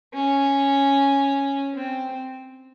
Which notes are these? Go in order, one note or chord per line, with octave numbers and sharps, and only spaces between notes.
C#4
C4